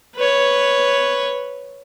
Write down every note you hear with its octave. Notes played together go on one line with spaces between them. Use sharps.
B4 C#5